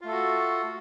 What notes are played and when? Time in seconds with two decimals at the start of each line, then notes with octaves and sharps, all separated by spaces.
0.01 F4
0.05 A3
0.08 A4
0.11 F#4